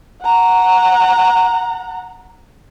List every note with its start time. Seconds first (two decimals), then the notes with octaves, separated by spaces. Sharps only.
0.23 F#5 A#5